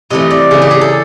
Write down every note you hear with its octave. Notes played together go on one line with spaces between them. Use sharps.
C3 E3 A3 D#5
D5
C#3 E3 A3 G#4
G4
G#4
A4